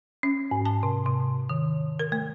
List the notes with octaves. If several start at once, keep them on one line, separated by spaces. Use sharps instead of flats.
C#4
G#2
A5
C3
C3
D#3
A#4
A3